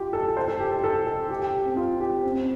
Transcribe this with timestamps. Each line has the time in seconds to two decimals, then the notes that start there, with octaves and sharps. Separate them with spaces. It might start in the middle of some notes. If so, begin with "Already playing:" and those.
Already playing: F4 G4
0.13 A4
0.28 A4
0.37 C5
0.48 A4
0.60 G4
0.71 A4
0.84 A4
1.07 A4
1.30 G4
1.42 G4
1.65 C4
1.76 F4
2.00 G4
2.23 C4
2.35 C4